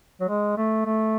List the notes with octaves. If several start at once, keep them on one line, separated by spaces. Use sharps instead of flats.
F#3
G#3
A3
A3